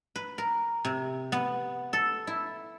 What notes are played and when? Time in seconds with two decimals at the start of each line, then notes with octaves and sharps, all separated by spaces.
0.16 B4
0.38 A#4
0.85 C3
1.32 B3
1.93 A4
2.27 E4